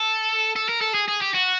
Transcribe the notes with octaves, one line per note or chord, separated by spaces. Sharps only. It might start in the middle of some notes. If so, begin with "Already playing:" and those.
Already playing: A4
A4
A#4
A4
G#4
G#4
G4
F#4